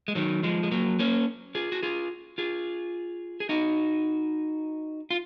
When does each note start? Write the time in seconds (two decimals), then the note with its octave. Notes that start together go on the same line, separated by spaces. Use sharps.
0.08 G#3
0.15 D#3 F#3
0.43 F3 G#3
0.63 G#3
0.71 F#3 A#3
0.99 A#3 C#4
1.55 F4 G#4
1.72 F#4
1.83 F4 G#4
2.38 F4 G#4
3.40 G#4
3.49 D#4 F#4
5.11 F4